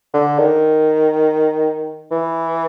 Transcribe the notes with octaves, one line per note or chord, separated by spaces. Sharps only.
D3
D#3
E3